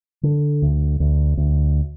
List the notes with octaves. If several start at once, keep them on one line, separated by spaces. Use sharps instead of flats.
D3
D2
D2
D2